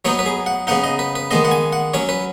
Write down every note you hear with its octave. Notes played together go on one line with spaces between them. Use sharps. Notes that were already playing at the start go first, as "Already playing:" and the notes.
F#3 B3 D#4 C#5
B4
G#4
F#5
C#3 B3 D#4 F#5
D#5
B4
B4
D#3 G#3 B3 D#5
F#5
G#5
F#5
F#3 C#4 C#5
B4